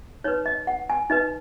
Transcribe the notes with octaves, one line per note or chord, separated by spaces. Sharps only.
D#4 B4 C#5
D#5
F#5
G#5
D#4 B4 D#5